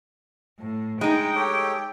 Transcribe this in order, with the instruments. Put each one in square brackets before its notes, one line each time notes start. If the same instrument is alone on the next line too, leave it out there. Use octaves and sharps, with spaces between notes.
[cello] A2
[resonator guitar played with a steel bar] G#3 D#4 [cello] G5 [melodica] A#5
[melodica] G4 A4 C#5